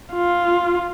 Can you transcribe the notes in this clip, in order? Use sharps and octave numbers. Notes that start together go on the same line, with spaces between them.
F4